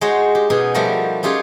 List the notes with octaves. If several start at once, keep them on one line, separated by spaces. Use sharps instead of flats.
G#3 D#4 F#4 C5 C#5
G4
B2 D#4 G#4
F3 G3 A3 F#4 A#4
C#4 D#4 F4 G4 G#4 C#5